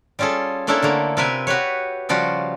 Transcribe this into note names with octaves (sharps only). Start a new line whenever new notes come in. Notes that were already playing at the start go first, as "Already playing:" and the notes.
G3 C#4 F4 G#4 A4
A#3 C#4 D4 E4 F4 A4
D3 A3 A#3
C3 F4 A#4 B4 E5 G#5
F#4 G4 B4 C#5
C#3 F3 G3 F4 F#4